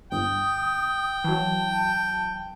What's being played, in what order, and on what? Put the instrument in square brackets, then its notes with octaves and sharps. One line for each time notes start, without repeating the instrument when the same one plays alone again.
[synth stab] G1 [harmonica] G5 [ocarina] D#6
[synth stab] E3 F#3 [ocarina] A5